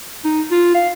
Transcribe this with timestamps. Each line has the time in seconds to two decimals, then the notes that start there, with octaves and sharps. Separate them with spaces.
0.25 D#4
0.51 F4
0.75 F5